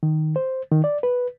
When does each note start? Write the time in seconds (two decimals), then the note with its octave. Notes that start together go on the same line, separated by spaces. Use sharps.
0.03 D#3
0.36 C5
0.72 D#3
0.84 D5
1.03 B4